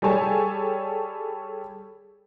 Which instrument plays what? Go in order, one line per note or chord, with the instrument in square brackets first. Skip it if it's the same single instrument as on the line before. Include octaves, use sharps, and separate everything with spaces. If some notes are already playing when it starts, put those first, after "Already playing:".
[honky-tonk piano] G3 G#4 A4 C#5 G#5 A5